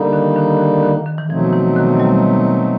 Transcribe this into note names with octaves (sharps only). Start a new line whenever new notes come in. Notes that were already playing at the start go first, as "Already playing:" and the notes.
Already playing: D3 G3 A#3 D#4
D#3
D#3
D#3
D#3
D#3
D#3
E3
B2 F3 F#3 A3 C4 D#4
E3
D#3
G3